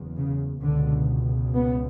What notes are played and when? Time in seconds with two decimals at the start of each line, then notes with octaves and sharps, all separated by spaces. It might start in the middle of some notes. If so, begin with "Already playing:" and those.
Already playing: F#1 E2
0.17 C#3
0.62 C#2 B2 D3
1.54 B3